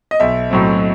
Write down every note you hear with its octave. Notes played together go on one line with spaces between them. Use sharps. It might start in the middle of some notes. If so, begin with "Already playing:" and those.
D#5
B1 E5
A2 F#3 C4